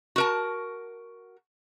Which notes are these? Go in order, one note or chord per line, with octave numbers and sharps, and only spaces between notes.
F#4 A#4 A5